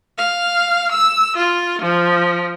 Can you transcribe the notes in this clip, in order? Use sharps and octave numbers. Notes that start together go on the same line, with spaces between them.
F5
E6
F4
F3